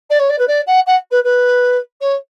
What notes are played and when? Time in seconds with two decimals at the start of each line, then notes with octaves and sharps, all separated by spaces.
0.10 D5
0.19 C#5
0.29 D5
0.38 B4
0.47 D5
0.66 F#5
0.86 F#5
1.11 B4
1.24 B4
2.01 C#5